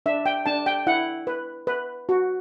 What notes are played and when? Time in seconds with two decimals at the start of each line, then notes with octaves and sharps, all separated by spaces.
0.06 D4 E5
0.26 G5
0.46 D4 A5
0.66 G5
0.87 E4 F#5
1.27 B4
1.67 B4
2.09 F#4